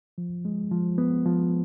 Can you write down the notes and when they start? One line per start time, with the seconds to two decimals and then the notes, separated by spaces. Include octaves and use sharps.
0.18 F3
0.45 G#3
0.71 F3
0.98 B3
1.26 F3